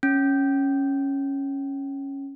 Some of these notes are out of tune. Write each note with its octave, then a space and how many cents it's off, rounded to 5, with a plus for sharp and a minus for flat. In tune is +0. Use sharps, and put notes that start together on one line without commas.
C#4 -5